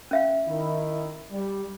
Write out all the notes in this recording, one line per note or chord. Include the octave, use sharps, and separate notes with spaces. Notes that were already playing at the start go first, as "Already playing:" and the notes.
C#4 E5 F5
D#3 E4
G3